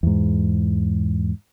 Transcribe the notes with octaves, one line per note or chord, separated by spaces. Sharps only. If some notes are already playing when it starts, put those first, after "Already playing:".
E2 G#2